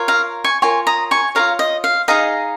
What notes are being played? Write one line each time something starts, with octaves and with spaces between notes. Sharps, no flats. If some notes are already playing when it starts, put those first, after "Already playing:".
Already playing: F4 A#4 C#5
F5 A#5
G#5 C#6
F4 A#4 C#5 G#5 C#6
A#5 D#6
G#5 C#6
F4 A#4 C#5 F5 A#5
D#5
F5
D#4 G#4 D#5 F5 A#5